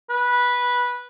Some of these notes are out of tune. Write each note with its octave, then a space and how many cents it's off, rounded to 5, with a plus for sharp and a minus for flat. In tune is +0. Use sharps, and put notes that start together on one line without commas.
B4 -10